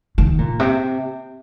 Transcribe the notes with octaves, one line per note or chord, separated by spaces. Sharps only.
D#3
A#2
C3